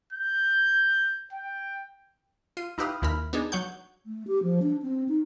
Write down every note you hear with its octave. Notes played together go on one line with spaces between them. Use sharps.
G6
G5
F4 C7 D#7
D#4 E4 G4 B4 F5 D#6
D#2 E4 A#4 B5 F6
B3 D4 D#4 G#4
F#3 C#5 F#5 G6
A3
G4
F3
D4
C4
D#4